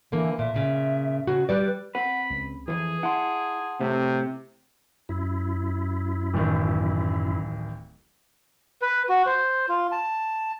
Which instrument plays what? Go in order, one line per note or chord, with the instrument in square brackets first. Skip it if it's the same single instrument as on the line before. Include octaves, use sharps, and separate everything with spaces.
[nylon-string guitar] D3 A#3 [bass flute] E3
[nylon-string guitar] A#2 [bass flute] E5
[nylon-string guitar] A#2 C#3
C#3 F#4
[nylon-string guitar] G3 D5 [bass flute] B4
[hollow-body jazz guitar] C4 B4 [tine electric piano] F#5 [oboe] B5
[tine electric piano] C#2
[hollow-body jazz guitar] C2 F2 [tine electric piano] E3 [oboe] G#4
[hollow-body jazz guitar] E4 [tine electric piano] F#5 A5 C6
[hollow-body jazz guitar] A2 A3 [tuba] C3
[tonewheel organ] F#2 E4
[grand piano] D1 A1 D#3
[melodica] B4
F#4
C5
F4
A5